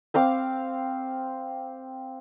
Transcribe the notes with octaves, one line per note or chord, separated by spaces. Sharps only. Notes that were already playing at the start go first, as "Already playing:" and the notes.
C4 F5 D6